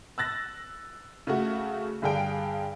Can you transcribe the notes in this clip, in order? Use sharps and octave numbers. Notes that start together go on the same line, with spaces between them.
E6 F#6 A6 A#6
C#3 A3 F#4
G2 D3 G#4 F5 G5 D7